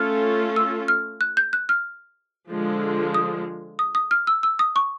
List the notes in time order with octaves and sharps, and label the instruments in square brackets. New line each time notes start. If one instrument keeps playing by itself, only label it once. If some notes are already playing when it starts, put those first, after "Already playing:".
Already playing: [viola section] A3 C#4 F4 A4 [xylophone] F6
[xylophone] E6
F6
F#6
G6
F#6
F6
[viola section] D3 F3 G#3
[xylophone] D#6
D#6
D#6
F6
E6
E6
D#6
C#6